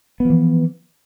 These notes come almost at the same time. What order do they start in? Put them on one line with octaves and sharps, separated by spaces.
B3 F3 E3